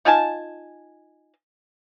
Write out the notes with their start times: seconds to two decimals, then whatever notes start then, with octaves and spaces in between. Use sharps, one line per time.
0.05 D#4 F4 G#5 A5